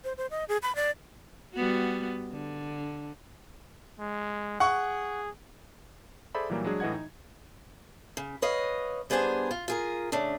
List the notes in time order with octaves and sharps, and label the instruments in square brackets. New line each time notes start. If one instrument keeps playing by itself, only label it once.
[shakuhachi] C5
C5
D#5
G#4
B5
D5
[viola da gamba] G3 B3 F#4
D3
[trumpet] G#3
[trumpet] G#4 [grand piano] F#5 C#6
[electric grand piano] G#4 A4 C5 D5 E5 B5
A#2 E3 F#3 G3 A#3
F#3 G#3 D4 G#4
A2 E3 D#5 F#5 G#6
D#4
[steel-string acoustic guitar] C#3
B4 C#5 D#5 F5
G3 B3 D4 G#4 C5 G#5
F4
F4 G#4 A#4
C#3 A3 D4